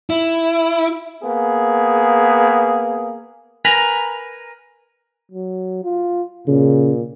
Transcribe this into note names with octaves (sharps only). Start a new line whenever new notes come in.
E4
A#3 B3 G#4
A#4 B4 G#5 A#5 B5
F#3
F4
A#2 C#3